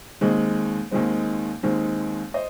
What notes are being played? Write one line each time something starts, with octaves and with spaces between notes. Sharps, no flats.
D#2 D#3 G#3 C4
D#2 D#3 G#3 C4
D#2 D#3 G#3 C4
C5 D#5